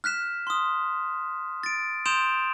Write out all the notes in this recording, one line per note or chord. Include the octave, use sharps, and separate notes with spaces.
F6 F#6 B6 E7
C6 D#6
A6 D7
C6 D#6 G6 D7 E7 F7